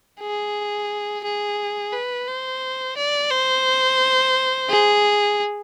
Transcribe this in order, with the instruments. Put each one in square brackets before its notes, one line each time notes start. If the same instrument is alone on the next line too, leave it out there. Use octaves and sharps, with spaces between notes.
[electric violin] G#4
G#4
B4
C5
D5
C5
G#4